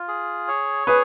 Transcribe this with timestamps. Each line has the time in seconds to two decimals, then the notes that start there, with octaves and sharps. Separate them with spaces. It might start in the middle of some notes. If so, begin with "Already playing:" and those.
Already playing: F4
0.08 G#4
0.48 C#5
0.87 G#4 B4